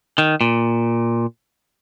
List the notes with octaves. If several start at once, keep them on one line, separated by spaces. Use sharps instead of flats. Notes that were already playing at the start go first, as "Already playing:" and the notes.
D#3
A#2